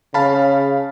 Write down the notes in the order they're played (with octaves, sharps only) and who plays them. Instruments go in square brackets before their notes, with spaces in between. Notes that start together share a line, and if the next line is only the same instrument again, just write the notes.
[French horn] C#3 [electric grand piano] F5 A5 B5